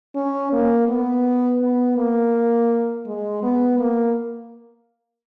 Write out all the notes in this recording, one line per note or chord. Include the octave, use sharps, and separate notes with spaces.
C#4
A#3
B3
B3
A#3
G#3
B3
A#3